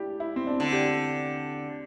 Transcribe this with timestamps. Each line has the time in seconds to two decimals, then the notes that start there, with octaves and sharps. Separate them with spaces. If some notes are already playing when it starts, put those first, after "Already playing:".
Already playing: D4 E4 G4
0.20 E4
0.36 C4
0.47 D4
0.60 D3
0.72 G4